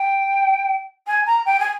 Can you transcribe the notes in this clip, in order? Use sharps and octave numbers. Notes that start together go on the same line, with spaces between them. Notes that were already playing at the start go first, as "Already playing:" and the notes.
Already playing: G5
G#5
A#5
G5
G#5